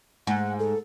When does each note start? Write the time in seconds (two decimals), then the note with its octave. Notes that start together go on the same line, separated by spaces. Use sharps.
0.27 G#2 F#5
0.59 A4